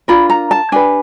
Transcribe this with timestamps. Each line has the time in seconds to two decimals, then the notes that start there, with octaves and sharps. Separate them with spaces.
0.08 D4 F4 A#4 B5
0.30 A#5
0.51 A5
0.72 D4 G4 B4 G#5